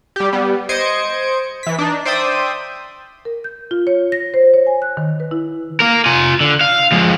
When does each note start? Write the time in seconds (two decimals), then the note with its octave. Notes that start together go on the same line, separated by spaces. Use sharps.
0.16 G3 G4
0.33 G3 B3
0.69 C5 D#5 G#6 C#7 D7
1.63 E3 B6
1.79 D4 D#4
2.05 C5 D5 E5 G5 D#6
3.25 A#4
3.44 G6
3.71 F4
3.87 C#5
4.12 A#6
4.34 C5
4.54 C#5
4.67 G#5
4.82 F#6
4.97 D#3
5.20 B4
5.31 E4
5.80 A#4 F5
6.06 F4 G#5
6.41 D3
6.61 F5
6.92 F3 G#3